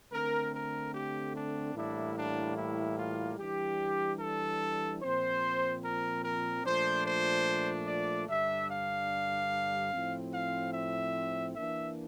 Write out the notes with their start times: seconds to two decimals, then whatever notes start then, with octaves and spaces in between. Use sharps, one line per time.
0.12 D3 A3 C4 A#4
0.54 A#4
0.94 G4
1.35 D4
1.76 A2 E3 G3 A#3 D4 E4
2.16 D4
2.57 E4
2.97 F4
3.38 E3 G3 D4 G4
4.20 A4
5.02 A#2 F3 C4 C5
5.83 A#4
6.24 A#4
6.65 A#2 F3 A3 D4 C5
7.06 C5
7.87 D5
8.28 G2 D3 G3 D4 E5
8.69 F5
9.92 A2 F3 C4
10.33 F5
10.73 E5
11.54 E3 A#3 D4 E5